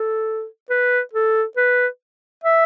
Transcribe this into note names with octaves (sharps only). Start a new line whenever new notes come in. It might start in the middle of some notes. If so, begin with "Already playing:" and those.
Already playing: A4
B4
A4
B4
E5